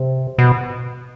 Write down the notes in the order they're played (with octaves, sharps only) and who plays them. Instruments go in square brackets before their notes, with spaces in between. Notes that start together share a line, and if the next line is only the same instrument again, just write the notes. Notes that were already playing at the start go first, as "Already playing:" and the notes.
Already playing: [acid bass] C3
B2